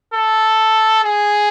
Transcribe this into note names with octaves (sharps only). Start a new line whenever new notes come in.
A4
G#4